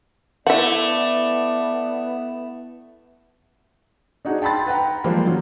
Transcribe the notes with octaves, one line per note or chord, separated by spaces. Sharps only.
A3 B3 E4 D5 E5 F#5
D4 D#4 F#4 G#4
G5 A5 B5 C6 A6
B4 F#5 G5 A#5
F3 G3 G#3 A#3 C5
F#3